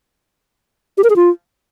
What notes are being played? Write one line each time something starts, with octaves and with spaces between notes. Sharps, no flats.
G4
A#4
G#4
F4